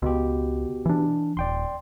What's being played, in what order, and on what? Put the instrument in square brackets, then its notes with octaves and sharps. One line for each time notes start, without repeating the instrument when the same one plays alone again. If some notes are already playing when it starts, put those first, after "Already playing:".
[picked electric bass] C#2 [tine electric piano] B2 G4
[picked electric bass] E3 D4
[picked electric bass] D#1 [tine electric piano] D5 G5 C6